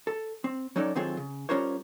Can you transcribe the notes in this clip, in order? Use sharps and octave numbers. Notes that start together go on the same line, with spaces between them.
A4
C4
F#3 C#4 D#4 A4 D5
D#3 F#3 C4 F4 G#4 A4
C#3
G3 C#4 F4 A#4 C5 C#5